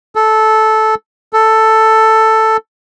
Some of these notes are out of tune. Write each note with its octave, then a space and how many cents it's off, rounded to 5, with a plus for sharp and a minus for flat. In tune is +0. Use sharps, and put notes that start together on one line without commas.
A4 -10
A4 +5